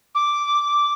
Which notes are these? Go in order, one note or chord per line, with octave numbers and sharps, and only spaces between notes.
D6